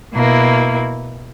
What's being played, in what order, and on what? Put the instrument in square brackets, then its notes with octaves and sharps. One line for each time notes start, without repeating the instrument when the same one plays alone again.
[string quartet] B2 A#3 E4